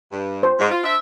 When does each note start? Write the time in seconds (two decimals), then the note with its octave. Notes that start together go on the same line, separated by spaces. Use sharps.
0.12 G2
0.43 C5
0.60 G#2
0.71 F4
0.84 D4 C5 E5